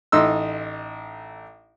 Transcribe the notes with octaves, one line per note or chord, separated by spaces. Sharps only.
A1 D#4 D#5 C6 E6